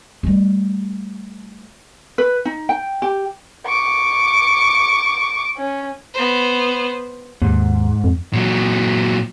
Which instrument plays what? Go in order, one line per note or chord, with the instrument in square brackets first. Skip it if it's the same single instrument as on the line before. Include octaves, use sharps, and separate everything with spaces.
[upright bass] G3 A3
[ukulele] B4
D#4
G5
G4
[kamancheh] C#6 D6
C#4
[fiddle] B3 C5
[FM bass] D#2 [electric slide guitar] G#2
[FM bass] F2
[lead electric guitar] A#2 F#3